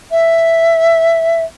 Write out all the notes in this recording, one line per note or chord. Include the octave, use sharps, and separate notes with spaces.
E5